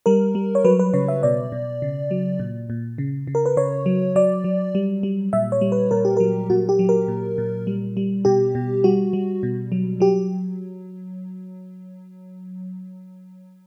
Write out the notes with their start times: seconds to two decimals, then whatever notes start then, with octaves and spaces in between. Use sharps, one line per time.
0.06 G3 A#4
0.35 G3
0.55 C#5
0.64 F#3 B4
0.79 B4
0.94 C#3 C#5
1.08 E5
1.23 B2 D5
1.52 B2
1.82 C#3
2.11 F#3
2.39 A#2
2.70 A#2
2.98 C#3
3.27 C#3
3.35 A#4
3.46 B4
3.57 C#3 C#5
3.86 F#3
4.16 F#3 D5
4.44 F#3
4.75 G3
5.03 G3
5.33 A#2 E5
5.52 C#5
5.61 G3
5.72 B4
5.91 A#2 A#4
6.05 G4
6.17 F#3 A#4
6.50 A#2 F#4
6.69 G4
6.79 F#3
6.89 A#4
7.08 A#2
7.38 A#2
7.67 G3
7.97 G3
8.25 B2 G4
8.55 B2
8.84 G3 F#4
9.13 G3
9.43 B2
9.72 F#3
10.00 F#3 G4